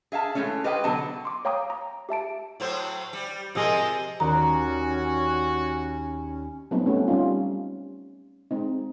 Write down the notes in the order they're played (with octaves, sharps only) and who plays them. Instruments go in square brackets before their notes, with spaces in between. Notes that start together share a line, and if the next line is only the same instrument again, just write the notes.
[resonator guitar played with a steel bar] G#4 E5 F5 A5
E3 F3 G#3 A3 C#4
G4 B4 C5 D#5 F5 G5
B2 D3 F#3 B3 D#5 A5
[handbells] C6 D6
C#5 F5 G5 A#5 D6 D#6
A#5
G4 E5 A5 D7
[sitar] A2 F#3 C5
G3
[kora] C3 G#4 A#4 [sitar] F3 G#3 [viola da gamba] D#5
[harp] D#2 A#4 D5 [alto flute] C#4 [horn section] F#4 [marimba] A#5
[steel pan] F#3 G3 A3 B3 C4 D#4
A3 C#4 F#4
G3 C#4 D#4 F4
G#3 C4 D#4